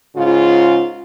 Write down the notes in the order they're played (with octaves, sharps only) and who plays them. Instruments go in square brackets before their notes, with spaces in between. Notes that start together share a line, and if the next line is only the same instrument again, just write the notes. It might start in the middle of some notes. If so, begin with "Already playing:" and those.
[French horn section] G#2 C#3 F4